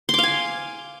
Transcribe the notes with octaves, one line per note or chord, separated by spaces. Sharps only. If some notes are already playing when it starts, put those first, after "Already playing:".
F5 G#5 C6 D6